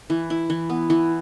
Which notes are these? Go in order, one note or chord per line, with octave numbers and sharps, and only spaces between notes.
E3
E4
E3
B3
E3